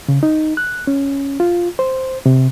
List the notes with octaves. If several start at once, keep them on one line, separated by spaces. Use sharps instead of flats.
C#3
D#4
F#6
C#4
F4
C5
C3